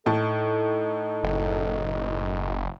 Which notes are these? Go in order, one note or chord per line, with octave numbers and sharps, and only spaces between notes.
A2 D#4 A4 A5
F#1